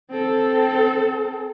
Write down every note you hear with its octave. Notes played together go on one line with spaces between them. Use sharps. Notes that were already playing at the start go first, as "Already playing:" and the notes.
C4 A4